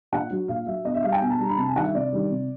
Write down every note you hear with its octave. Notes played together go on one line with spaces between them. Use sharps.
A#2 F#5
F#3
A#2 F5
F#3 E5
B2 D#5
E5
G3 F5
G5
B2 G#5
A5
G3 A#5
B5
C3 A5
G#5
D#3 G3 F#5
E5
C3 D5
D#3 G3
C3